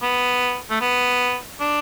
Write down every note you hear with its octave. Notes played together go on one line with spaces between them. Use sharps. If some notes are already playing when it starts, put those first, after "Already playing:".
B3
A3
B3
D4